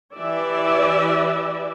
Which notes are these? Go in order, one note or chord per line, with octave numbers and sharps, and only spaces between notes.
E3 G4 D5 E5